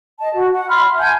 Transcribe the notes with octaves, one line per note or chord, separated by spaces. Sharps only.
D#5 A5
F#4
F#5
B5 C6 F6
E5
F#5 G#5 A5 G6